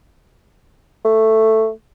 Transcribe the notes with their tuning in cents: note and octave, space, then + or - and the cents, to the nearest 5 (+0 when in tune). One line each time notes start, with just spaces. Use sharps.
A3 +5